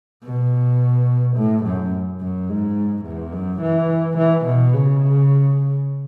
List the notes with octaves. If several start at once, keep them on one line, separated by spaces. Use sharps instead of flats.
B2
A2
F#2
F#2
G#2
E2
F#2
E3
E3
B2
C#3